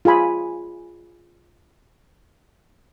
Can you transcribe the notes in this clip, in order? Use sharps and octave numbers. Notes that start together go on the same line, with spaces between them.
F4 G#4 G#5 B5